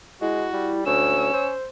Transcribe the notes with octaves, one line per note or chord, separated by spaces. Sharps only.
G#3 E4 F#4
G3
D2 C#4 C#5 E6
C5